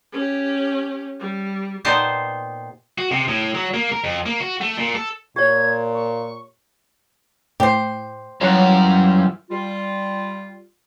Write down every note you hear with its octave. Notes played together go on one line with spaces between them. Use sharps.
C#4 G4
G3
A#2 B3 D#4 G4 C5 A5
F#4
C3
A2
F#3
A#3
A#4
F2
A#3
F#4
A3
A#2
A4
A#2 G4 C#5 G#6
C#6
A2 G4 C5
F#2 E3 G3 F4 C#5 F#5
G3 F4